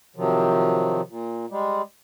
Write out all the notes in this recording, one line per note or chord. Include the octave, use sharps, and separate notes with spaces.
C3 D#3 F3 F#3
A#2
G3 G#3